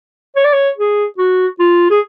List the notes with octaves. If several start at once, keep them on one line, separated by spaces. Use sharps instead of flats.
C#5
D5
C#5
G#4
F#4
F4
G#4